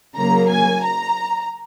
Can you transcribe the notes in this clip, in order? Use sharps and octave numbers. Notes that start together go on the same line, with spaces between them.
C#3 F#3 A#3 A#5
G#5
A#5